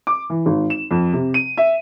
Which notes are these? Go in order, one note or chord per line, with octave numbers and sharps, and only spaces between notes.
D6
E3
G#1
E7
F2
C3
D#7
E5